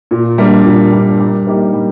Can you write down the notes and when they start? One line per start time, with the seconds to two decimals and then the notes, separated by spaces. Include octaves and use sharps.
0.11 A#2
0.38 G3 A#3 D4
0.66 A#2
0.92 G3 A#3 D4
1.20 G3
1.47 A#3 D#4 G4
1.74 G3